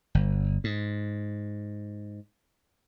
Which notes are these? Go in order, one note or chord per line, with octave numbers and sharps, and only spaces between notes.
G1
G#2